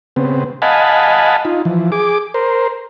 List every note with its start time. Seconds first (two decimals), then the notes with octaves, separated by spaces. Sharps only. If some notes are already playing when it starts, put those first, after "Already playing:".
0.16 C#3 B3 C4
0.62 D#5 F5 F#5 G#5 A5 B5
1.45 D#4 F4
1.65 E3 F3
1.92 G#4 D6
2.34 A#4 C5